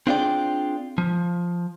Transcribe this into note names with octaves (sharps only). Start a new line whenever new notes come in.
C4 D4 F4 G#4 D5 G5
F3